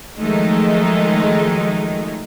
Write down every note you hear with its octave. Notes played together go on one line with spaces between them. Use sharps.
D#3 F3 F#3 G#3 A3 D#4